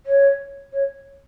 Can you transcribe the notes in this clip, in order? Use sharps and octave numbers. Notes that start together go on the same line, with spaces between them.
C#5
C#5